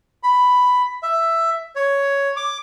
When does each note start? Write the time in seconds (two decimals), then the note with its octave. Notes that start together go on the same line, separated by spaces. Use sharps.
0.23 B5
1.03 E5
1.76 C#5
2.37 D6